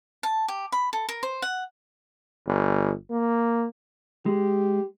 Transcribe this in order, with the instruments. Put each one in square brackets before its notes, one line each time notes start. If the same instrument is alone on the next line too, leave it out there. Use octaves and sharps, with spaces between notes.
[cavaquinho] A5
G4
B5
A4
A#4
C5
F#5
[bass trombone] G1
A#3
[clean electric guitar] G#3 [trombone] G4